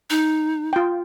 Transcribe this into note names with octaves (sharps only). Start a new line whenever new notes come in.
D#4
F4 G5